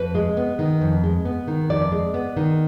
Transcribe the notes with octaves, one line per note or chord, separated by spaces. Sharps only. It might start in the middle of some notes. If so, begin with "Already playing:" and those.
Already playing: F2 B4
G#3
B3
D#3
F2
G#3
B3
D#3
F2 D5
G#3
B3
D#3